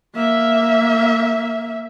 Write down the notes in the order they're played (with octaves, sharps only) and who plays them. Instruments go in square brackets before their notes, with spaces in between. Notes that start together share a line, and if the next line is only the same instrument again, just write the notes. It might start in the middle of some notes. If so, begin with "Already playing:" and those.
[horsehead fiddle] A#3 E5